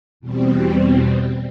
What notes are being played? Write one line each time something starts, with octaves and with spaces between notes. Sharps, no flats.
E2 B2 G3 C4